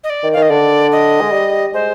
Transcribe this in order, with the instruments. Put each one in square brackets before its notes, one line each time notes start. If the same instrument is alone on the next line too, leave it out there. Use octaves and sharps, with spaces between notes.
[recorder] D#5
D5
[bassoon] D#3
[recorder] F5
[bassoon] D#3
[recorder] D#5
[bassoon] D3 [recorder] D5
[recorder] D#5
[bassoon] G#3
G3
[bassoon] G#3 [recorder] C5